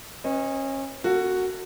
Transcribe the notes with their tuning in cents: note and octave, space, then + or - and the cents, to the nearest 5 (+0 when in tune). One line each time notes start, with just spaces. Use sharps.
C#4 -30 B4 +0 D#5 +5
A#3 +0 F#4 +0 A4 +40